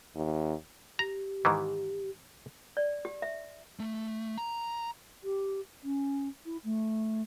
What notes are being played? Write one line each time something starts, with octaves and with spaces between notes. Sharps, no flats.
D#2
G4 A#5
G#2 D#3 E3
D5
G4
E5
A3
A#5
G4
C#4
E4
A3